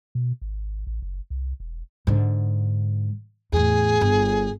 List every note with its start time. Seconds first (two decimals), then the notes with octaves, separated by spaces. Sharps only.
0.15 B2
0.41 G#1
0.87 A1
1.02 F#1
1.30 C2
1.60 E1
2.07 G#2 D3
3.52 E2 A2 G#4
4.01 G1